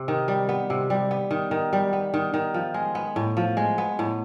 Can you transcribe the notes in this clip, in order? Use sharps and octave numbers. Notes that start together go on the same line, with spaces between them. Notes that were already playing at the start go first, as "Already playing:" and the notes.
Already playing: C3
D#3
G3
B3
C3
G3
B3
D#3
D#3
G3
B3
D#3
D#3
F3
G#3
B3
A2
F3
G#3
B3
A2